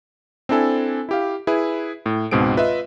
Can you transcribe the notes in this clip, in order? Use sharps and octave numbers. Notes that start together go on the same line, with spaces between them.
C4 D4 E4 A4 G#5
E4 G4 F5
E4 G#4 B4
A2
C#2 G#2 B2 C4 G#4 D7
F4 B4 D#5 E5